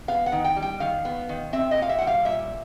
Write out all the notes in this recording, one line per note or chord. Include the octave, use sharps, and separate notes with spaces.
B3 F5
F#5
D#3
G5
G3
G5
D#3 F5
B3
D#3
C4 E5
D#5
A#2
F5
E5
G3 F#5
F5
A#2 E5